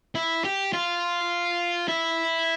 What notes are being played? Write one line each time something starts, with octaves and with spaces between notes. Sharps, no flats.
E4
G4
F4
E4